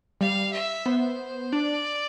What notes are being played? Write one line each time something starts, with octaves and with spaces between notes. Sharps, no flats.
G3 F5
E5
B3 C5
D4 D5